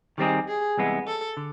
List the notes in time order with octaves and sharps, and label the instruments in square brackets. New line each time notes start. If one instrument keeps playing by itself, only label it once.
[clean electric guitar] D#3 G3 C4 D#4 G#4 [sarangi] G4
[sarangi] G#4
[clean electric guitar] C2 C3 E3 G#3 B3
[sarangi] A4
[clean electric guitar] D3